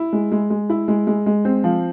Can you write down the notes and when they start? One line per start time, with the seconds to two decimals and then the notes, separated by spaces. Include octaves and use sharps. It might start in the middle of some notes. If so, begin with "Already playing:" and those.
Already playing: E4
0.13 G#3
0.32 G#3
0.50 G#3
0.70 E4
0.88 G#3
1.07 G#3
1.26 G#3
1.45 C4
1.64 F3